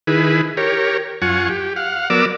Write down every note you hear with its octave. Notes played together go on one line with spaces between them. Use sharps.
D#3 E4 G#4 B4
G4 A#4 C#5
F#2 F4 F#5 G#5 C#6
G4
F5 F#5
F#3 B3 A#4 D5 D6 E6